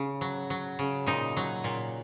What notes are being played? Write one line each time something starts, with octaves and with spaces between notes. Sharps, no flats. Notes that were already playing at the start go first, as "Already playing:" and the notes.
Already playing: C#3
F#3
F#3
C#3
A#2 D#4
F#3
A#2